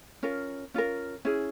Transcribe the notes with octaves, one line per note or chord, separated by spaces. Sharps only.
C#4 F4 A#4
C#4 F4 A#4
C#4 E4 G#4